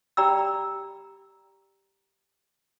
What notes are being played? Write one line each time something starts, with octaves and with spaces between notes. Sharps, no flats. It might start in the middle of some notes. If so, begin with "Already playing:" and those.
G4 D5 G5 A#5 B5 E6